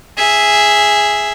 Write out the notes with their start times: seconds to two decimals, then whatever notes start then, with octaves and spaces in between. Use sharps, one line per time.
0.17 G#4 E5